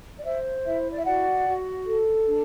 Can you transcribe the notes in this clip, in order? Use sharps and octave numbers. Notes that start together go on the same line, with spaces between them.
D5
C5 E5
E4 E5
D5
E5
F#4 D5 F#5
F#4
A4
D4